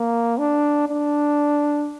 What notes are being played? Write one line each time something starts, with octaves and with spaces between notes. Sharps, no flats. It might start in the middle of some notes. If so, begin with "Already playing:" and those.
Already playing: A#3
D4
D4